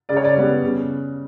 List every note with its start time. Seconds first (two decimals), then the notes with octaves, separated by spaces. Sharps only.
0.09 C#3 D5
0.17 C#5
0.24 D5
0.36 G3 B3
0.63 C#3